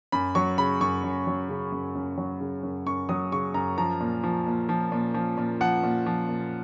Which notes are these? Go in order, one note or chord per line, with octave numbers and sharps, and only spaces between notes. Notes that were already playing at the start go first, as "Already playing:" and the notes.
F#2 B5
F#3 C#6
C#3 B5
F#2 C#6
F#2
F#3
C#3
F#2
F#2
F#3
C#3
F#2
F#2 C#6
F#3 D#6
C#3 C#6
F#2 A#5
F3 A#5
A#2
F3
A#2
F3
A#2
F3
A#2
F3 F#5
A#2
F3
A#2